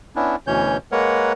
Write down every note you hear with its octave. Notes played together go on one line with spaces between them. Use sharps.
B3 C#4 D4 E4
D2 B2 E3 C#4 C#5 G6
G#3 A#3 A#4 B4 C#5 F#5